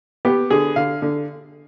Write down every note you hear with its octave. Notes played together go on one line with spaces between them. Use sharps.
B3 G4
D3 G#4
D3 F5
D3